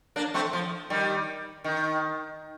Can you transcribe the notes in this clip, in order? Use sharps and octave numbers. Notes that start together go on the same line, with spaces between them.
A#3 D4
A3 C4
F3
D#3 G3
D#3